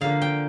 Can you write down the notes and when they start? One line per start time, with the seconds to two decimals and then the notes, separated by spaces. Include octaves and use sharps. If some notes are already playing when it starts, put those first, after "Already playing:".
0.01 D3 F3 A#3 D4 F5
0.22 G5